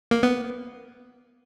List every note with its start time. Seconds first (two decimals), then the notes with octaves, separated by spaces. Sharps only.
0.11 A#3
0.23 B3